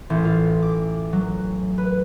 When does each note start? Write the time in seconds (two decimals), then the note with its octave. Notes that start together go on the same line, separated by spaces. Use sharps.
0.10 A1
0.24 F4
0.62 D6
1.13 F#3
1.78 B4